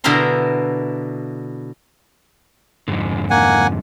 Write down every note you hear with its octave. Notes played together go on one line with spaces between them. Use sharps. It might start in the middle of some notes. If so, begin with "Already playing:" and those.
B2 D3 E4 A#4 A#5 C6
F2 G#2 D3
A#3 F#5 G#5